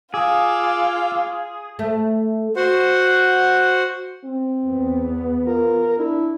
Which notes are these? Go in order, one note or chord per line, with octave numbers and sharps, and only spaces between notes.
F4 G#4 F5 D6 E6
A3
F#4 C5 F#5
C4
E2 B3
F4 A#4
D4 E4